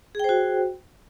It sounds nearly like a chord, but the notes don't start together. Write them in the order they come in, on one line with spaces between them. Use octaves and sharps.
G#4 G5 C5 F#4